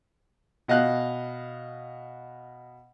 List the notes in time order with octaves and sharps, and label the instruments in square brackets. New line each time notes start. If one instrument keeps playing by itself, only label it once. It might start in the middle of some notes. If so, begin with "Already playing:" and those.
[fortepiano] B2 D#5 F5 F#6